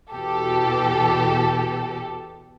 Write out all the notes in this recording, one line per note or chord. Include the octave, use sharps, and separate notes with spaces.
E2 B2 G4 A4